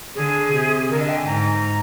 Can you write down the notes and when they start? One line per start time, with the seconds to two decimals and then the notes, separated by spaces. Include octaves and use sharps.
0.15 D3 G#4
0.53 C3
0.90 D3 A#4
1.00 D#5
1.09 G5
1.18 G#5
1.27 G#2 A#5